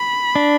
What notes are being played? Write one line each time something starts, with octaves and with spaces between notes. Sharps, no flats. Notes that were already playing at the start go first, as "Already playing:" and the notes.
Already playing: B5
D4